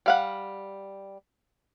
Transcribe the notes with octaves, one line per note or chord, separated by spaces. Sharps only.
G3 F5 F#5